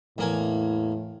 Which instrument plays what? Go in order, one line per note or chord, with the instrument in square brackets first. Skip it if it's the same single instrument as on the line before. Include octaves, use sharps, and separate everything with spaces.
[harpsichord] E2 A#3 G#5 [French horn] A2